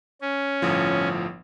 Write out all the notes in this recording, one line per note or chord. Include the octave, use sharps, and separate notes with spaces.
C#4
G1 A2 F3